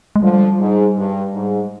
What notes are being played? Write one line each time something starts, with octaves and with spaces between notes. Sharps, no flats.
G#3
D3 F3 G3
G#2
G2
G#2